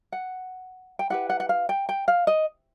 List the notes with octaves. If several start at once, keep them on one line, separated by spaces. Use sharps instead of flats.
F#5
G5
E4 G4 B4 F#5
F#5
F#5
F5
G5
G5
F5
D#5